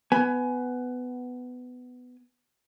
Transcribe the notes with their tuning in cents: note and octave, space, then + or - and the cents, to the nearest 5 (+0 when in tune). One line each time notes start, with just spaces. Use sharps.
B3 +15 G#5 +20